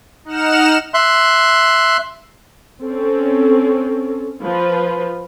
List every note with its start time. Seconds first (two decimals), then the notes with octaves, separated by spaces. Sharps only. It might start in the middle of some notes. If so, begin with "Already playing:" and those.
0.25 D#4 F#5 F6 E7
0.94 E5 C6 F#6
2.82 C4 C#4 A4
4.41 F3 F4 B4